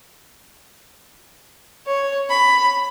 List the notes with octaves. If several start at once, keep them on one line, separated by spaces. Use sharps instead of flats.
C#5
B5